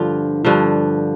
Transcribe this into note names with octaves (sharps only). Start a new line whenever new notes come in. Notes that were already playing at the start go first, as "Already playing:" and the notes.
Already playing: G2 D3 F3 F4
G2 D3 F3